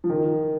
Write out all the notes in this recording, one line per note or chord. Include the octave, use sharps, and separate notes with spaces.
F3
D#3